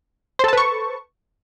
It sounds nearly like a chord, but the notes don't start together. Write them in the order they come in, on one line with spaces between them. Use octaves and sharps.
C5 A4 A5 B4 C#6